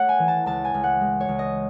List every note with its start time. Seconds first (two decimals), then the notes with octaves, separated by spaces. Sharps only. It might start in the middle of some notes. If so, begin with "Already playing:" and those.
Already playing: A3 C#5 F#5
0.09 G#5
0.19 E3
0.28 A5
0.46 C#2 A5
0.65 G#5
0.74 C#2
0.83 F#5
1.01 G#3
1.20 C#5
1.29 C#2
1.39 D#5